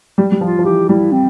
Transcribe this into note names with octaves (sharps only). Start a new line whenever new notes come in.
G3
G3
F3 F4
F3
E3 G4
G3 E4
C4